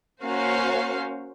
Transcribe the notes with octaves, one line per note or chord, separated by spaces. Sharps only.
A#3 C#4 F#4 C5 F5